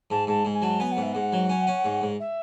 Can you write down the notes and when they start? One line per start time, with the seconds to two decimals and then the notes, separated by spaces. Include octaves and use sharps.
0.10 G#2 A5
0.27 G#2 A5
0.45 G#2
0.53 G#5
0.62 F#3 A5
0.79 B3 G#5
0.91 F#5
0.97 G#2
1.02 E5
1.12 G#2 F#5
1.33 F#3
1.49 C#4
1.67 C#4
1.84 G#2
2.01 G#2
2.19 E5